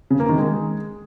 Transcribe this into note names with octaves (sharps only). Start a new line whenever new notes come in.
C#3
A#3
D#3
G#3